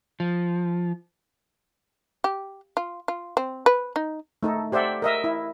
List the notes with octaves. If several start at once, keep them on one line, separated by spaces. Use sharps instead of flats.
F3
G4
F4
F4
C4
B4
D#4
A3 D#4 A4
G4 C5 D5 E5 F#5
A#4 D#5 E5
E4